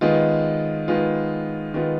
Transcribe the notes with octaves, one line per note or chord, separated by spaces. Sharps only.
D#3 G#3 B3 F4
D#3 G#3 B3 F4
D#3 G#3 B3 F4